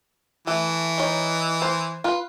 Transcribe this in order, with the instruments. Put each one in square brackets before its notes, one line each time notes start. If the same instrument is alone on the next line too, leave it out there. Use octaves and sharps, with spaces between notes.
[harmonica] E3 [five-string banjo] A3
[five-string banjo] D#4 C#5
C5
F4 B4